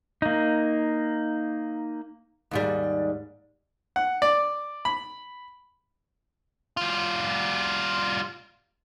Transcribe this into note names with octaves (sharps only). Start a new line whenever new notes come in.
A#3 D#4
D#2 G#2 G3
F#5
D5
B5
G3 F4